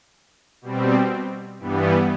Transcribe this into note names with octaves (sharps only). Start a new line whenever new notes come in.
B2 G3 C4
G2 E3 G3 B3